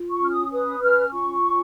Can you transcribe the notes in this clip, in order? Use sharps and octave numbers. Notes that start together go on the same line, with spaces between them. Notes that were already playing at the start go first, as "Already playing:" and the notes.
Already playing: F4
C#6
C#4 F6
D#6
B4 D#6
C#4 F6
F4 C#6
C#4